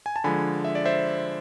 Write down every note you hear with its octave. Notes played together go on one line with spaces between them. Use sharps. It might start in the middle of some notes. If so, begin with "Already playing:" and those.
G#5
A5
D3 F3 G#3 G#5 B5
E5
D5
C5 E5